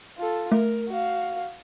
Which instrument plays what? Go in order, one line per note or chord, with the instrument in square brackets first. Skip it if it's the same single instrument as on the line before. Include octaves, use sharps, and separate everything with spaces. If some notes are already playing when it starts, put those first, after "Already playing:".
[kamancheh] F4 A4
[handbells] A3 [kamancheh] A#4
[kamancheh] F#4 F5